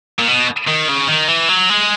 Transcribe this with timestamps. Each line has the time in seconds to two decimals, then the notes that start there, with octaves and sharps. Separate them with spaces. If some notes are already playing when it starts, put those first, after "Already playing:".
0.19 A#2
0.28 B2
0.68 D#3
0.89 C#3
1.08 D#3
1.28 E3
1.49 F#3
1.70 G#3